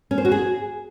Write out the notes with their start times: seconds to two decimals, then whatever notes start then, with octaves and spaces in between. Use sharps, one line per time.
0.11 C#4
0.18 C5
0.25 F#4
0.32 G#4